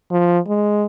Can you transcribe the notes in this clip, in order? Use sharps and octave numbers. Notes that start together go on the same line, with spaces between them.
F3
G#3